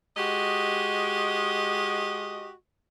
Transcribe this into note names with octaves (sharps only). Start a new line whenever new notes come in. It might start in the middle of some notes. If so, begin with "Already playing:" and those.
G#3 F#4 G4 D#5